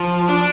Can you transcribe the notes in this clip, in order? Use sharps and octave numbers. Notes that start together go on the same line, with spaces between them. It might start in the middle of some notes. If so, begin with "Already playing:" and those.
Already playing: F3
D4